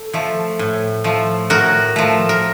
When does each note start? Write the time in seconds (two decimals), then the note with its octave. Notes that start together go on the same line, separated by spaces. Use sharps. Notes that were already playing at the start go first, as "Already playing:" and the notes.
Already playing: A4
0.13 F3 A3
0.59 A2
1.04 F3 A3
1.50 A2 F#4 A#4
1.96 F3 A3
2.29 A#4